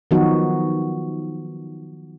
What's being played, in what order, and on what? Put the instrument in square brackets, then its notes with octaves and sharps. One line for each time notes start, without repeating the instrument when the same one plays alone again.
[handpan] D#3 F3 F#3 B3 D#4 F#4